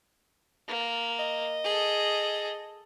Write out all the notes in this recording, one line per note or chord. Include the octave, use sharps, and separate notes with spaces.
A#3
D#5
G#4 A4